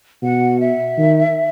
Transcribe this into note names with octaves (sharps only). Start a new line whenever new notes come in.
B2 F#5
E5
D#3